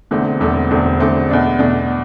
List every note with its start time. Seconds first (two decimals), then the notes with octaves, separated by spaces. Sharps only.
0.11 E1 E2 D3 A3 C4
0.40 E1 E2 D3 A3 C4
0.70 E1 E2 D3 A3 C4
1.00 E1 E2 D3 A3 C4
1.29 E2 B2 A3 D4
1.59 E2 B2 A3 D4